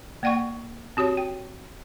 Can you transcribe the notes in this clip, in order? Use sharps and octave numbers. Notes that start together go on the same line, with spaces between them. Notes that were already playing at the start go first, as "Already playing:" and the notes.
A#3 D5 F#5 G5 C#6
C4 F#4 G4 C#5
G5